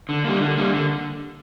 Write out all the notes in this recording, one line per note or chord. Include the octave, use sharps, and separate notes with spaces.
D3
G3 A#3
D3
G3 A#3
D3